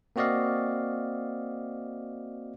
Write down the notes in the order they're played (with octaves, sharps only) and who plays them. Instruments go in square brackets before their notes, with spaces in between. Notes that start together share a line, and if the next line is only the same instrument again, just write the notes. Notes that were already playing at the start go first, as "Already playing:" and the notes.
[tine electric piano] A#3 C4 F#4 D5 D#5 F5